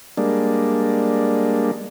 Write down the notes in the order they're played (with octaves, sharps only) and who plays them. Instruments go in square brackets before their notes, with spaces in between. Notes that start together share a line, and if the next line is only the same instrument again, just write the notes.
[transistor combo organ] G3 G#3 A#3 D4